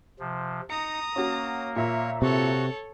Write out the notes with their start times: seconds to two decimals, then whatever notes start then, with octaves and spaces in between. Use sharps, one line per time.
0.20 C3 F3
0.70 D#4 A#5 D#6 C#7
1.16 A#3 C#4 F#4
1.76 A#2 C#5 E5 A#5
2.22 C3 F#4 A4 C#5